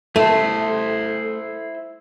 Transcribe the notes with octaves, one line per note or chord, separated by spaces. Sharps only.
A3 E4 C5